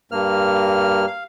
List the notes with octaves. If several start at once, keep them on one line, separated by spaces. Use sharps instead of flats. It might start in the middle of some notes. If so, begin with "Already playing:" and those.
G2 A#3 F6
F5